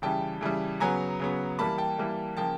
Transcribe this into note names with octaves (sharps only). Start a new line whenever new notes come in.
C#3 E3 G3 G5 A5
C#3 E3 G3
C#3 F#3 B3 G#5 A#5
C#3 F#3 B3
E3 G3 A#3 A5 B5
G5 A5
E3 G3 A#3
C#3 F3 A#3 G5 A5